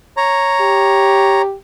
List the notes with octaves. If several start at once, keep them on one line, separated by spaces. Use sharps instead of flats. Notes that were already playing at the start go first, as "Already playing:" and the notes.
C#5 A#5
G4